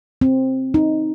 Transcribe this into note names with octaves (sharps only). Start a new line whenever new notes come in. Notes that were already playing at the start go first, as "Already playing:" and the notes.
C4
D#4